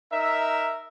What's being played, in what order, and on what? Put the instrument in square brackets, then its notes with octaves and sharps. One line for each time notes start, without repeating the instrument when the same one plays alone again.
[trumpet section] D#4 A#4 E5